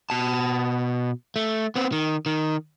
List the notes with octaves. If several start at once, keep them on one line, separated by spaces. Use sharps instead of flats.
B2 A5
A3
B3 C4
D#3
D#3